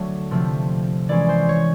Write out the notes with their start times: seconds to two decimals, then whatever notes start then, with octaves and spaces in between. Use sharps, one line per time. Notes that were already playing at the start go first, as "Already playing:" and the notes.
Already playing: D3 F#3 A3 C#5
0.31 C3 F3 A3 C4
1.09 E3 G#3 C#4 D5
1.29 C5
1.49 C#5